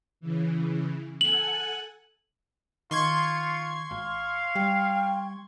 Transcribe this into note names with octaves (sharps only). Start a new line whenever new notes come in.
C#3 E3
A4 F#5 G#5 F#7
D#3 F4 C6 C#6 G#6
G#1 F5
G3 G5